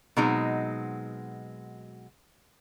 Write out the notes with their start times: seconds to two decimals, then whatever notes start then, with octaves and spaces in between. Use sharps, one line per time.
0.17 B2 F#3 G#3 C4 D#4